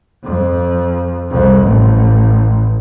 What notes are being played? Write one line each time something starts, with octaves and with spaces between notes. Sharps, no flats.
F2
C2 F2
A1